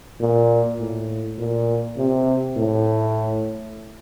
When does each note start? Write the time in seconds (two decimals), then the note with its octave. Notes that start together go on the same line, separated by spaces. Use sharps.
0.20 A#2
0.80 A2
1.38 A#2
1.97 C3
2.57 A2